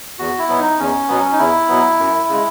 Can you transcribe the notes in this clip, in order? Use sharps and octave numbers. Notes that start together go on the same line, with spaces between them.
E2 F#4
E4
B2 F#3 B3
D#4
E2 C#4
B2 F#3 B3
D#4
E2 E4
B2 F#3 B3
F#2
C#3 G#3